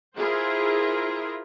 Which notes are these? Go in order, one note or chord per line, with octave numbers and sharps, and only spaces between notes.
E4 F4 G#4 A#4 C5